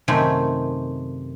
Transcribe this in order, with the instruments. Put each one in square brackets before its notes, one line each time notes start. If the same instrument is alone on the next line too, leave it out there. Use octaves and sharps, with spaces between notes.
[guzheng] F#2 C3 D#3 A3 G5 G#5